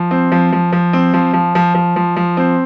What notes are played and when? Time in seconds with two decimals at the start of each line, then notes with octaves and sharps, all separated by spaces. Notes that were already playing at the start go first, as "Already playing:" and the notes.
Already playing: F3
0.11 C4
0.32 F3
0.53 F3
0.73 F3
0.93 C4
1.14 F3
1.34 F3
1.55 F3
1.75 F3
1.96 F3
2.16 F3
2.37 C4